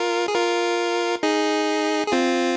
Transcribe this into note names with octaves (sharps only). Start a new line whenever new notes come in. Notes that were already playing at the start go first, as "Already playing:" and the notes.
Already playing: F4 A#4
G#4
F4 A#4
D#4 G#4
G#4
C4 F4